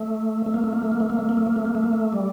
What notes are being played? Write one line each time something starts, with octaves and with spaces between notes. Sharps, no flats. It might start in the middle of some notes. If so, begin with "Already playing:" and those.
Already playing: A3
A3
A#3
A3
A#3
A3
A#3
A3
A#3
A3
A#3
A3
A#3
A3
A#3
A3
A#3
A3
G3